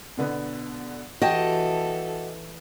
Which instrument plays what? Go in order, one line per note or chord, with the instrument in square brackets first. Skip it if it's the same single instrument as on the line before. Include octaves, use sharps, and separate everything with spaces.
[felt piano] B2 D3 B3
[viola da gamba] E3 A4 [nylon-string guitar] F#4 [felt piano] G4 [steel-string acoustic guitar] D#5 G5 A5